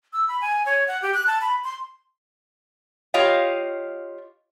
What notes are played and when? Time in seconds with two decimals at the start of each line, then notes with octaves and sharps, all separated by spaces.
0.13 E6
0.28 B5
0.41 G#5
0.66 C#5
0.88 F#5
1.02 G4
1.14 F#6
1.27 A5
1.41 B5
1.64 C6
3.14 F4 G4 C#5 D#5 F5